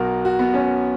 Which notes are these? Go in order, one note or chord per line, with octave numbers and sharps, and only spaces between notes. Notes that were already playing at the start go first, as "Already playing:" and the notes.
Already playing: B1 B2 F#3 F#4 A#4
F#4
B3
C#4